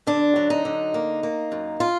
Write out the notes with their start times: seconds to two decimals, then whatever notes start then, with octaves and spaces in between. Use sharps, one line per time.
0.07 D3 D4
0.36 F#3
0.50 D#4
0.65 D3
0.94 A#3
1.23 A#3
1.52 F#2
1.80 F4